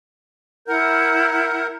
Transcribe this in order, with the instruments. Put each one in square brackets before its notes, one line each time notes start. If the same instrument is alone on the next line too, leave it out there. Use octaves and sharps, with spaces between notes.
[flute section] E4 F#5 G6 [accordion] A#4